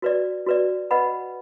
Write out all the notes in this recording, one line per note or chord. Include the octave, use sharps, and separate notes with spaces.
F#4 B4 D5
F#4 B4 D5
B4 D#5 F#5 B5